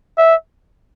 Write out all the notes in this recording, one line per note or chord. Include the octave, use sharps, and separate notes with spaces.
E5